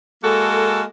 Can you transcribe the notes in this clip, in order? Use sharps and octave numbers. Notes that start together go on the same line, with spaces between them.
G#3 A#3 F#4 A4